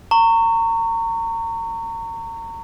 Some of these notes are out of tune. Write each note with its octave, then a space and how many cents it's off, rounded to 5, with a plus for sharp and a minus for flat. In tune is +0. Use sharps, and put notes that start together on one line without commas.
A#5 -30 C#6 +0